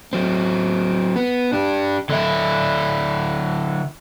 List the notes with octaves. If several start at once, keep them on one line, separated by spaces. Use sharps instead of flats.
F#3 C4
B3
D4 G4
D3 E4